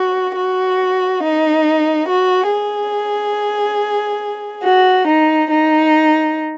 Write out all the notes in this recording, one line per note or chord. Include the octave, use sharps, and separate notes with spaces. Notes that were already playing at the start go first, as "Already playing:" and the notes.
Already playing: F#4
F#4
D#4
F#4
G#4
F#4
D#4
D#4